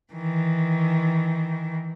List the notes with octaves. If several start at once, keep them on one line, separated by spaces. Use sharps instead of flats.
D#3 E3